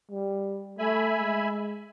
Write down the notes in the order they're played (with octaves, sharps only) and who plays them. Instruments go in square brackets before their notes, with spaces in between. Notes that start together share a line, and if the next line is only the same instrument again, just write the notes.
[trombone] G3
[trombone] A3 [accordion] E5 G#5 B5
[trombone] G#3